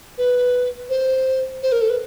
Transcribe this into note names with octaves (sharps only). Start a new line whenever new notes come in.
B4
C5
C5
A#4
A4
B4